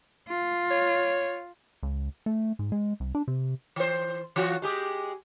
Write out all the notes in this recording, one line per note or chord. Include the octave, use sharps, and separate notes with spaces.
F4
C#5
C#2
A3
G#2
G#3
C2
D4
C3
E3 C5
E3 F4 F#4
G#3 G4 G#4